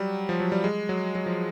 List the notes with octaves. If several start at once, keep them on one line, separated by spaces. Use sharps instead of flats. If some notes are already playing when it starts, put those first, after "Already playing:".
Already playing: F#3 G3
F3
F#3
G3
G#3
F#3
F#3
F3